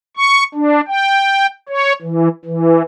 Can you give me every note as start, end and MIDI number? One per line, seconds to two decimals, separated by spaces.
0.17 0.44 85
0.55 0.81 62
0.88 1.46 79
1.69 1.93 73
2.02 2.28 52
2.45 2.82 52